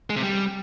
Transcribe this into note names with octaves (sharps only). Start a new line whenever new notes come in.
G#3
C3
G3